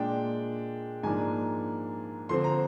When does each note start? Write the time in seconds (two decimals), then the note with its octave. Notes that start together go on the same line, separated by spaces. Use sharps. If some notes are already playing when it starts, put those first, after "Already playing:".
Already playing: A#2 G#3 D4 G5
1.03 G#2 F3 A#3 D4 G#5
2.29 D3 F3 C4 C6
2.44 A#5